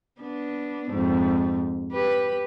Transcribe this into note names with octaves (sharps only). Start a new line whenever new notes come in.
B3 D4
F2 G#2
G4 B4